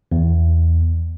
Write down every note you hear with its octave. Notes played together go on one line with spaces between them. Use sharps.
E2